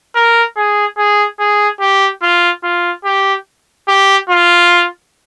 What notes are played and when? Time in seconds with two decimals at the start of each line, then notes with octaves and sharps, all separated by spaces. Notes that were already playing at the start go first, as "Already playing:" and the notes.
0.15 A#4
0.57 G#4
0.97 G#4
1.39 G#4
1.81 G4
2.22 F4
2.63 F4
3.05 G4
3.88 G4
4.29 F4